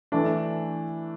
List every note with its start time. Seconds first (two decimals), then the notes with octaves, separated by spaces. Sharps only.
0.12 E3 A3 D4